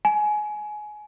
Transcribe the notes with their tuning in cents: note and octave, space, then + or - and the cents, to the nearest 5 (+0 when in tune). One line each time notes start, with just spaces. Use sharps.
G#5 +20